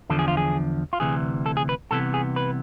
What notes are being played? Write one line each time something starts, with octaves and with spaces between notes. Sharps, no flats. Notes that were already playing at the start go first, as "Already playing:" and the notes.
E2 D3 F3 A4
G#4
F4
G#4
F4
D2 C3 E3 G#4
A4
G#4
B4
C2 C3 E3 B3 A4
G#4
B4